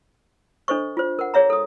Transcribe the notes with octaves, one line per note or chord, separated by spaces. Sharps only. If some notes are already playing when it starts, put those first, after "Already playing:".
D4 A4 C5 D#5 C#6
F4 C5
A#4 F#5
G#4 C#5 E5 A#5
A4 D#6